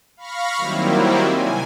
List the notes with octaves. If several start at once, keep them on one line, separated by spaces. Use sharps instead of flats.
F5 B5 C#6 F6 A#6
D#3 F#3 G3 A#3 C4 E4
C3 G#5